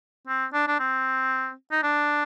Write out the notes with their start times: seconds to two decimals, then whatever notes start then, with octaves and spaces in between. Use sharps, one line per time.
0.27 C4
0.53 D4
0.68 D4
0.79 C4
1.71 D#4
1.83 D4